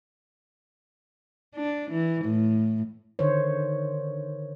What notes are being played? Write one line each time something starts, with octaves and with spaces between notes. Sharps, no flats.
D4
E3
A2
D3 D#3 C5 C#5